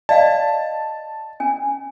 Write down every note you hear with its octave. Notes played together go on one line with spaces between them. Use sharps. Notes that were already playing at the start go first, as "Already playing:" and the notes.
D5 D#5 F5 A5
C#4 G#5